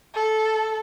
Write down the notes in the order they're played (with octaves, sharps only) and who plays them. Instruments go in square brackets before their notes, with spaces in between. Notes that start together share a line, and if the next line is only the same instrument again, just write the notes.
[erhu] A4